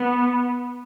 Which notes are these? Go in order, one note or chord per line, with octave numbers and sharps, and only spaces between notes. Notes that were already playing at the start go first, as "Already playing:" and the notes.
Already playing: B3